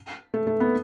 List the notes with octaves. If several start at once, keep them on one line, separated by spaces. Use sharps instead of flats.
A3
A3
B3